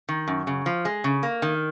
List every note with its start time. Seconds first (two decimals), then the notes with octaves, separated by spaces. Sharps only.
0.09 D#3
0.28 F#2
0.47 C#3
0.66 F3
0.85 G#3
1.04 C#3
1.23 A#3
1.42 D#3